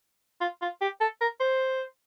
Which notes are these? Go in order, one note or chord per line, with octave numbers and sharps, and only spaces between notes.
F4
F4
G4
A4
A#4
C5